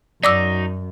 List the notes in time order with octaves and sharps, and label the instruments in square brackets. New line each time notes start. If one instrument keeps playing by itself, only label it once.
[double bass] F#2 [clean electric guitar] F#3 D#4 [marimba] D5 D6 E6